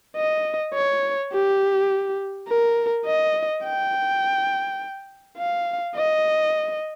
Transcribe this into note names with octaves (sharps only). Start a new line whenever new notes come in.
D#5
C#5
G4
A#4
D#5
G5
F5
D#5